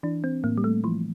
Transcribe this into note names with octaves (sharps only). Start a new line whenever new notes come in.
E3 D4
C4
A2 A#3
G3
A3
E3 F3